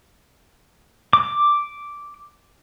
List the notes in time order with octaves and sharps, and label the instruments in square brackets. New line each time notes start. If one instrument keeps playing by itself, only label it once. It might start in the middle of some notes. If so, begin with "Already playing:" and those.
[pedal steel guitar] D6